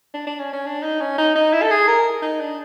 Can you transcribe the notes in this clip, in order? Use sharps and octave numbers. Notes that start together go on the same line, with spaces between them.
D4
D4
C#4
C#4
D4
D#4
C#4
D#4
D#4
E4
A4
G#4
A#4
D#4
D4